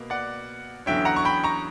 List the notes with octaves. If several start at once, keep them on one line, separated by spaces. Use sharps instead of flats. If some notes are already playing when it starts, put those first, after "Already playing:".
Already playing: B2 A#3
D5 F#5
E2 D3 F#3 C#4 E5 G5
F#5 A#5
C#6
G5 B5
A#5 C#6